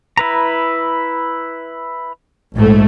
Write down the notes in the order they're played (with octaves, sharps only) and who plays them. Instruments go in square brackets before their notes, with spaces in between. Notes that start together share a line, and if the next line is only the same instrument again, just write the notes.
[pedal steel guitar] E4 B4 A#5
[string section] A#1 G#2 A3